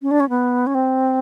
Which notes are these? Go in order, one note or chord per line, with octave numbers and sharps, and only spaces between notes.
C#4
D4
C#4
B3
C#4
C4